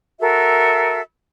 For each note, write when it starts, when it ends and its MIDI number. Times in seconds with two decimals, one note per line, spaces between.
0.19 1.00 66
0.19 1.00 69
0.19 1.00 70
0.19 1.00 76